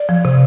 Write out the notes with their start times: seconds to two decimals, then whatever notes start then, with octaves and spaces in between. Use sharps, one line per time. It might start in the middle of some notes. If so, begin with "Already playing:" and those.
Already playing: D5
0.09 F3
0.25 C3